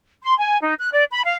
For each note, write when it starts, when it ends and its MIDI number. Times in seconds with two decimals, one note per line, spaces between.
0.22 0.36 84
0.38 0.59 80
0.62 0.74 63
0.79 0.90 90
0.92 1.04 74
1.11 1.21 83
1.25 1.36 77